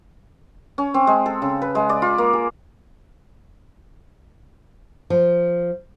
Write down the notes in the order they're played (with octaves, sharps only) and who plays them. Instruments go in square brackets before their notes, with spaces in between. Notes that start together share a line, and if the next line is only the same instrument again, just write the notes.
[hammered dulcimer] C#4
C4
G#3
A4
C#3
B4
G#3
D5
F4
A#3
G#4
[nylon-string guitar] F3